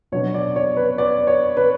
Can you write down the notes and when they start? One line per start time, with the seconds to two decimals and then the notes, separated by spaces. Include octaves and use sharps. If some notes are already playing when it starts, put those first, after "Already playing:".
0.12 B2 F#3 B3 D4 C#5
0.34 D5
0.56 C#5
0.77 B4
0.98 D5
1.27 C#5
1.57 B4